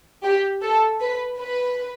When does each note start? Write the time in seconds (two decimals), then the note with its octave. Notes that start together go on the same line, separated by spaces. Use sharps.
0.24 G4
0.62 A4
1.01 B4
1.39 B4